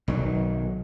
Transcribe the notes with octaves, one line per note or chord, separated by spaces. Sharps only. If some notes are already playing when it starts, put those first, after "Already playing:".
B1 D#3 F#3